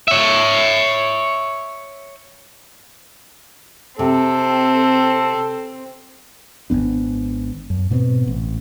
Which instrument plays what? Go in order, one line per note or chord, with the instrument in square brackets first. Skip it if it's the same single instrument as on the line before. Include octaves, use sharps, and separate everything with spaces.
[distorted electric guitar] C#5 E5
[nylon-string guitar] C3 [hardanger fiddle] C4 [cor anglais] A4
[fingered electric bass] G#1 B2 B3 D4
F#2
G#2 B2 B3 C4
A1